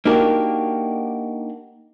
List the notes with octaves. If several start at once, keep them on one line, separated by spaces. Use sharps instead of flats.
A#3 D4 D#4 F#4 G4 A#4